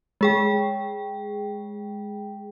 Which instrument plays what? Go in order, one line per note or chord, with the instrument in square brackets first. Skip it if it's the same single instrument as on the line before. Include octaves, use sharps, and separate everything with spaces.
[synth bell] G#3 G#4 G5